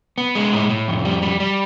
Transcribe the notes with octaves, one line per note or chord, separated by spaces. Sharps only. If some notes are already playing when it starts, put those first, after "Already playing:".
B3
G#3
A2
A2
F2
G3
G3
G3